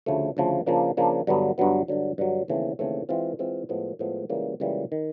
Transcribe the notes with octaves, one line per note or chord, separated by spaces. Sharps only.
D2 C#3 F3 A3
D2 C#3 F3 A3
C#3 F3 A#3 D4
C#3 F3 A#3 D4
G2 D3 F#3 B3
G2 D3 F#3 B3
G2 D3 F#3
G2 D3 F#3
D#2 C#3 E3 A3 C4
D#2 C#3 E3 A3 C4
E3 G#3 C4 F4
E3 G#3 C4 F4
A2 F3 G#3 B3
A2 F3 G#3 B3
C#2 C#3 E3 G3 A#3
C#2 C#3 E3 G3 A#3
D#3